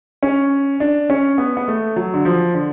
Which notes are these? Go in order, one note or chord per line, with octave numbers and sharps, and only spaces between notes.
C#4
D4
C#4
B3
B3
A3
F#3
D3
F3
D3